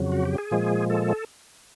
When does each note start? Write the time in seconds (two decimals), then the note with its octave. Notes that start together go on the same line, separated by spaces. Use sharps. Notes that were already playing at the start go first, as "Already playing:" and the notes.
Already playing: F2 C#3 F#3
0.12 F#4
0.25 G4
0.38 G#4
0.51 A#2 F3 G#3
0.90 A4